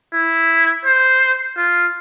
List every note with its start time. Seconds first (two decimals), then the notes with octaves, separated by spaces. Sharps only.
0.14 E4
0.85 C5
1.58 F4